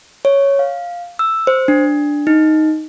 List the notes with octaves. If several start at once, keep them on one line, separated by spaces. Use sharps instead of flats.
C#5
F5
E6
C5
D4
D#4